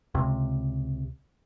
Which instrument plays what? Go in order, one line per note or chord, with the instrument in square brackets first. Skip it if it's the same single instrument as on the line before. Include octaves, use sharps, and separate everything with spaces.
[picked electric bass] C#2 C3